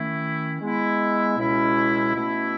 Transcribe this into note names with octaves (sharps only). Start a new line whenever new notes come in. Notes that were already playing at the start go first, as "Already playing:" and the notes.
Already playing: D#3 A3 C#4 E4
G#3 B3 E4
C#2 B2 G#3 C#4 E4
B2 A3 C#4 E4